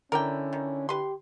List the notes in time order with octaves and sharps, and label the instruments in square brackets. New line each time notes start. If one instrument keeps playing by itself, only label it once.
[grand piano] D3 E4 [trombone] C#4 [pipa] A#4 D5 G5
[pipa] D#3
[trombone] G4 [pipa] B4 C6